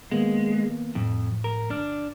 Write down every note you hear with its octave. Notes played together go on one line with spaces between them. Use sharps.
D#3 G#3 A#3 B3
F2 A2 F3
A#4
G1 D4 F6